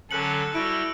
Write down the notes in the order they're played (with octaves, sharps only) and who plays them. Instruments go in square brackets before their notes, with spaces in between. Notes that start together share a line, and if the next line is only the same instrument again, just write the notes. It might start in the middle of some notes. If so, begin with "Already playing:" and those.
[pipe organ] D3 F#3 C#4 [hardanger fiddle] A4 [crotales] F#6 C#7 F#7
[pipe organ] G3 F#4 [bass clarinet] E4 [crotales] E6 D7